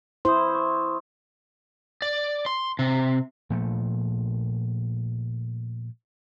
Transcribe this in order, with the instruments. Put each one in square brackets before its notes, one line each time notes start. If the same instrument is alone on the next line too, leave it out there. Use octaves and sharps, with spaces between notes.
[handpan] E4 C5 [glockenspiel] C6 D#6
[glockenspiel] C#6
[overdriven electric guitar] D5
C6
C3
[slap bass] A#2 F3 A3